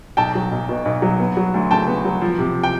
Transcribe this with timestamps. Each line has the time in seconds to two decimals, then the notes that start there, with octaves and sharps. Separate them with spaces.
0.17 B1 G5 A5
0.35 F#3
0.52 B1
0.69 B2
0.85 B1
1.02 F#3
1.20 B3
1.37 F#3
1.54 D2
1.71 C#3 G5 A5
1.88 B3
2.05 F#3
2.22 F3
2.39 C3
2.63 G5